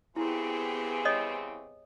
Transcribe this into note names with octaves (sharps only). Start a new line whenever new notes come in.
C#3 E3 B3 C4 E4 G4 G#4
C#5 D#5 D#6